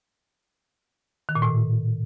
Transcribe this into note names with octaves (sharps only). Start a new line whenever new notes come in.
D#3
A#2
A2